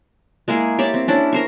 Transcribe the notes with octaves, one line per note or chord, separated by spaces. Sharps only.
G#3 A#3 E4 G#4
G4 C#5 D5 E5
C4
C#4 D4 E4
A#4 C5 C#6